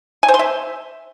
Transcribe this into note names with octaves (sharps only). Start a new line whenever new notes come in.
G#5
C5
C6
E5